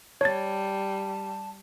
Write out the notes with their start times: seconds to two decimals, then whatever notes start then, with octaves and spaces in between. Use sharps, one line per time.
0.21 G3 C#5 A5 A6